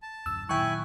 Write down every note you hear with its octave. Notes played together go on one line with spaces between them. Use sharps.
A5
D1 F#2 E6
A#2 D#3 F#3 E4 G5 G#5 C#6 F#6